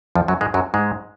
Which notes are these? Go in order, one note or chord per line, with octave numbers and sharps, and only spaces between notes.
F2 F3
F#2 F#3
G#2 G#3
F#2 F#3
G#2 G#3